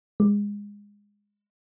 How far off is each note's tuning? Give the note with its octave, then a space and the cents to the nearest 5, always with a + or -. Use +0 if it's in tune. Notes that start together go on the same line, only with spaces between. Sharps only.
G#3 -20